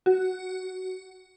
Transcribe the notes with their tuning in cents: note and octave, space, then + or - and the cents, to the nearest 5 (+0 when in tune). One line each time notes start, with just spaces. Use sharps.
F#4 +10